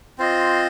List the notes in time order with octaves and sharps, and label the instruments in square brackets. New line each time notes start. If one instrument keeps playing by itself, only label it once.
[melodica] C4 F4 C5 D#5